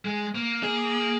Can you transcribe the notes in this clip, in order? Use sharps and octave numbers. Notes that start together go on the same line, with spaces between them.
G#3
A#3
G#4